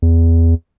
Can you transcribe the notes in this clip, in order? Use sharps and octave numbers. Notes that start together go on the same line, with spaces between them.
E2